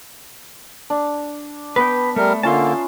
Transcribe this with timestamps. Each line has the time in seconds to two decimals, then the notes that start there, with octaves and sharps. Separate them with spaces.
0.90 D4
1.76 B3 B4 G5
2.16 G3 A3 A#4
2.43 D3 A#3 C#4 F4 E5 A5 C6